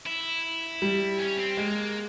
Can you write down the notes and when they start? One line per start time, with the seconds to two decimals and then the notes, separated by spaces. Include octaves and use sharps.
0.06 E4
0.82 G3
1.19 C#4
1.38 C4
1.57 G#3 A#3